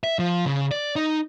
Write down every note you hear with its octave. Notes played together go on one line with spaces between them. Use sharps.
E5
F3
C#3
D5
D#4